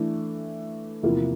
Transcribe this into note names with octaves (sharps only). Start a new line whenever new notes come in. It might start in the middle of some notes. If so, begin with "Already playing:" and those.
Already playing: E3 A3 D4
E2 C3 F3 A#3 E4